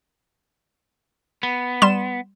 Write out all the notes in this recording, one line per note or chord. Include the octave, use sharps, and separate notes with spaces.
B3
G3 C6 E7